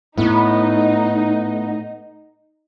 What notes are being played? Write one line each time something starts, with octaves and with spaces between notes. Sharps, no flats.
A2 B3 D#4